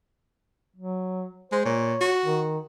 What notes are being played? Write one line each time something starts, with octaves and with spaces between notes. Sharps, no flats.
F#3
G#3 C5
A#2 C#5
F#4
D#3